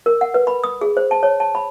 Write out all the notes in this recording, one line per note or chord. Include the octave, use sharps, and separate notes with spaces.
A#4
F#5
B4
B5
D#6
G#4
C5
A5
C#5
A5
B5